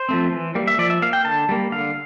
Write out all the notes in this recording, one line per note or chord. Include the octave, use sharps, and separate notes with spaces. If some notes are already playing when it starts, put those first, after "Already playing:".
Already playing: C5
F3 A3 C4
E3
G3 A#3
E5
F3 D5
E5
A#3 F5
G5
D3 A5
G3 A#3
D3 F5